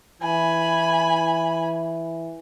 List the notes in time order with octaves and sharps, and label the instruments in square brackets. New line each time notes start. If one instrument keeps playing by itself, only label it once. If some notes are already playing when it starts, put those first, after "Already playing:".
[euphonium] E3 [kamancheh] G#5 B5